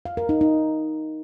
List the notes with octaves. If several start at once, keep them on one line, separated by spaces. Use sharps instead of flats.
F5
A#4
D#4
D#4